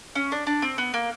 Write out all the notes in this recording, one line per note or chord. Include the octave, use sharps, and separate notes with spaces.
C#4
D4
D4
C4
B3
A#3